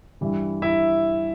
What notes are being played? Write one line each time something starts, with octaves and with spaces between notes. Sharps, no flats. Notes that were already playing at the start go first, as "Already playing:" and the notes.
G2 E3 G3
E4 E5